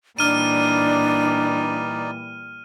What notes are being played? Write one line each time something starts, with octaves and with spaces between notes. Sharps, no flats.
A#2 E3 G3 D4 D#4 D5 F6 D#7